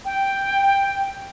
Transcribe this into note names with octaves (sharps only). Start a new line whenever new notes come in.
G5